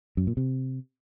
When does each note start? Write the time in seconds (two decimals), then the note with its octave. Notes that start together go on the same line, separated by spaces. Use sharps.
0.17 F#2
0.27 A#2
0.37 C3